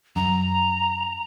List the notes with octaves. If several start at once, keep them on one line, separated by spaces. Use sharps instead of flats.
F#2 A#5